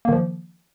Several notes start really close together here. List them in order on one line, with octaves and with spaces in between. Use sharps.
A#3 D#3 F3